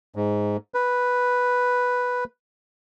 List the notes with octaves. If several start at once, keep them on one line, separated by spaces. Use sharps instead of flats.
G#2
B4